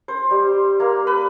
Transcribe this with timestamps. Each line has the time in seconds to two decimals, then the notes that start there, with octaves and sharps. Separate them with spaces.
0.08 C5
0.31 G3
0.80 A#3
1.07 B4